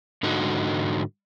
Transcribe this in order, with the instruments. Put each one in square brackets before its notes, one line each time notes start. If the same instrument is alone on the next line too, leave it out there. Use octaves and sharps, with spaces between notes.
[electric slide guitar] G#2 D3 D#4 F#4